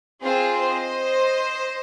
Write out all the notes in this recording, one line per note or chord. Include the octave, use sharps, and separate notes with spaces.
C4 F4 G#4 C5
C5 D#5